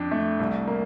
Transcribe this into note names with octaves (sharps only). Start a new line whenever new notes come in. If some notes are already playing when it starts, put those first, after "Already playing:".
Already playing: F2 D4
A3
C2
A#3